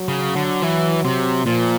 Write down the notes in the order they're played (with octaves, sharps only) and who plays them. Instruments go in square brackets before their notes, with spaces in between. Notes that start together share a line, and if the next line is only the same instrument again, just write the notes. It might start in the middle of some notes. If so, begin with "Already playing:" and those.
Already playing: [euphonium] F#3
[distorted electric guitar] C#3
D3
E3
C3
[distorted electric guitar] A#2 [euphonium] F3